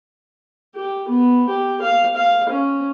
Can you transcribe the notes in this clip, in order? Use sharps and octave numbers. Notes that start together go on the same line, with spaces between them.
G4
B3
G4
F5
F5
C#4